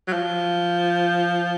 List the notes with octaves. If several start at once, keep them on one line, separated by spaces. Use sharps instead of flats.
F#3
F3